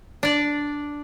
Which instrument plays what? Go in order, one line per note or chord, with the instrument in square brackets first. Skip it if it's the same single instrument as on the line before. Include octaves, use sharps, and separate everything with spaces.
[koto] D4 D5